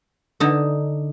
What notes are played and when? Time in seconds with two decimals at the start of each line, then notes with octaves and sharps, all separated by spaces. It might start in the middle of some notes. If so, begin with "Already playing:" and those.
0.40 D3 D#4